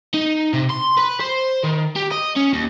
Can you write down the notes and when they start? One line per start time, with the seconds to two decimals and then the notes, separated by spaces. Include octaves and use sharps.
0.14 D#4
0.54 C3
0.70 C6
0.98 B4
1.21 C5
1.63 D#3
1.96 G4
2.12 D#5
2.37 C#4
2.53 D#2